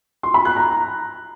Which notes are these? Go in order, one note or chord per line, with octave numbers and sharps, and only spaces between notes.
C6
B5
F#6
A#5